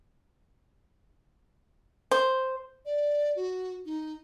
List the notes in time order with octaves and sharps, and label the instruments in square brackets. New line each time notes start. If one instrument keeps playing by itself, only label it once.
[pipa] C5
[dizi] D5
F#4
D#4